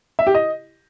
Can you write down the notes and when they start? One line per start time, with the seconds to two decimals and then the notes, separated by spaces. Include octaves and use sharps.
0.19 E5
0.27 G4
0.35 D#5